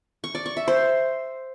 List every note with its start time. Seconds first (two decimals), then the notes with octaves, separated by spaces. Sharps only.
0.24 C#6
0.35 D5
0.46 C#6
0.57 E5
0.68 C5